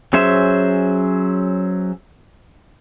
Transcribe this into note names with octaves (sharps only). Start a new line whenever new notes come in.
F#3 C#4 G#4 C5 E5